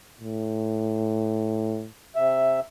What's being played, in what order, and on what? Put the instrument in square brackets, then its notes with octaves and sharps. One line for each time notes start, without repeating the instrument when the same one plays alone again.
[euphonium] A2
[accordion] C3 E5